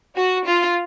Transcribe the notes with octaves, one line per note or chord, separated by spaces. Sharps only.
F#4
F4